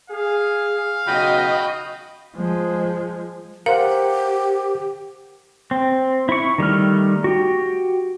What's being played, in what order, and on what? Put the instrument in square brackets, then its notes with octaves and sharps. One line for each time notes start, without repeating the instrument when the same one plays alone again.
[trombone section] G#4 [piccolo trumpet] F5
[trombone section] B1 E2 C#3 [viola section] F#4 D#5 [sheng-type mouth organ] G5 B5
[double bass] F3 G#3
[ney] G4 [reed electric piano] A#4 C5 F#5 [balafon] F5
[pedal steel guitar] C4
E4 C#6
D#3 G3 A3 F6
F#4 G4